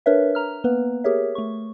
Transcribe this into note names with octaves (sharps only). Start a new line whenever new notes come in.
D4 A#4 B4 C#5 E5
A#5 F6
A#3 B3 B4
G4 G#4 A#4 C#5 E5
A3 C#6